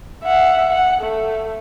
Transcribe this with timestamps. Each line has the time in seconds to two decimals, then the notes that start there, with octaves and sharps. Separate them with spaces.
0.24 E5 F#5
0.71 F#5
1.02 A3